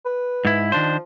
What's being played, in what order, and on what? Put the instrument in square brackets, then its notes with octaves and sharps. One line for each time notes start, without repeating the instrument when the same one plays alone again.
[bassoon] B4
[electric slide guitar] G#2 E4
[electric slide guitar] D#3 D4 C5 [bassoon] F3